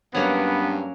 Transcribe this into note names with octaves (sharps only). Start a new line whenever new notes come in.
G2 F#3 A#3 B3 C#4